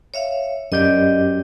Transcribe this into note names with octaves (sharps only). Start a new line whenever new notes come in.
C#5 E5 F5
F#2 G4 D5 D#5 G6